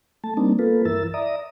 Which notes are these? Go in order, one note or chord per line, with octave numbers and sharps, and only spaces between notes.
A3 A5
G3 A#3 C4 D4 D#4
A#3 B3 F4 A4 B4
G2 E3 E4 A#4 E6 A6
D5 E5 A#5 D#6